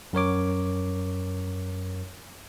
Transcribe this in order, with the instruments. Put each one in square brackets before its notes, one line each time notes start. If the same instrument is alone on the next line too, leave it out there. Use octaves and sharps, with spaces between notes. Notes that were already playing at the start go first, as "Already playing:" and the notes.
[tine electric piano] F#2 A#4 C#5 D6